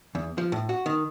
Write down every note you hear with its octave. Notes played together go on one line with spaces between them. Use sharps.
E2
F3
A2
F#4
D#3